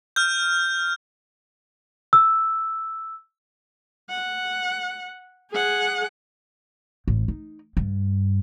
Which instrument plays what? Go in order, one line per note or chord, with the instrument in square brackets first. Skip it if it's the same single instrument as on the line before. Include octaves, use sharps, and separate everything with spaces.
[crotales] F6 G6
[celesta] E6
[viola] F#5
G#4 F#5
[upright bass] A1
D#4
G2